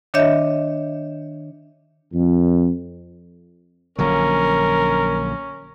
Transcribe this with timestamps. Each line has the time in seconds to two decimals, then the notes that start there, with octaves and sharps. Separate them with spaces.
0.14 D#3 D4 C#5 D#5 E5 G6
2.12 F2
3.98 A#1 D3 F#3 C#4 A#4